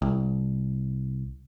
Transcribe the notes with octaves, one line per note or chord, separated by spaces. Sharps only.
C2